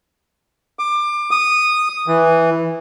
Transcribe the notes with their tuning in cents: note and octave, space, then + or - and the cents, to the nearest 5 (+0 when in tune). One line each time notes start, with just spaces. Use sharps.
D6 +25
D#6 -10
E3 +0